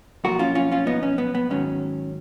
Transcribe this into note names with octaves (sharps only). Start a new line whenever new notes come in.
B1 A#2 F3 F#4 A#4
C#4 F4
C#4 F4
C#4 F4
B3 D#4
C#4
B3
B3
G#2 D#3 F#3 C#4